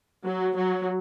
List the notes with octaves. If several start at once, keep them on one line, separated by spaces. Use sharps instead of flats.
F#3
F#3